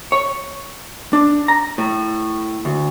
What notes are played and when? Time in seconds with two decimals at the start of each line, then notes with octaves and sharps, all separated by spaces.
0.12 C#5
1.13 D4
1.48 A#5
1.78 A2
2.65 D2